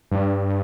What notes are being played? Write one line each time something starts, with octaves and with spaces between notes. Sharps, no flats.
G2